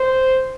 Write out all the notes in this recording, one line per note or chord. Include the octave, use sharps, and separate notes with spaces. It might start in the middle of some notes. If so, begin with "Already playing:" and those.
Already playing: C5